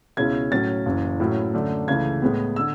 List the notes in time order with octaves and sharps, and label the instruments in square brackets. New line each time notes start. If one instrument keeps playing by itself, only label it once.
[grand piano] C#2 B2 G#3 C#4 E4 G#6
A2 F#3 C#4 A6
F#1 F#2 E3
A2 F#3 C#4 E4
F#2 D3 A3 D4
C#2 C#3 E3 A3 G#6
A2 G#3 B3
D3 E6